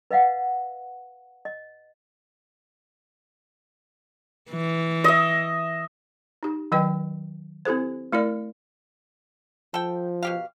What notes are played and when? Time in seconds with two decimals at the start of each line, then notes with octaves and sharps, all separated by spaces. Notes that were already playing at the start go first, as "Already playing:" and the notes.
0.11 B4 D#5 F5 F#5
1.45 D#5
4.51 E3
5.04 D#5 E5
6.43 D#4 G4
6.72 D#3 F#3 B4 D#5 G5
7.65 C4 E4 G4 A4 C5
8.13 A3 E4 A#4 D5
9.74 F3 A4 G5
10.23 B2 G4 F5